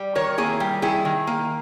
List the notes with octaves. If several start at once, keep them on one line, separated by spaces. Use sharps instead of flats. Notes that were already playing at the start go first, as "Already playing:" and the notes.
Already playing: G3
D#3 A#4 C#5
A#3 E4 G#4
G3
D#3 E4 G#4
D#3
A#3